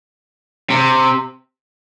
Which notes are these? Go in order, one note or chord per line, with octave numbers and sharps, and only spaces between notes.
C3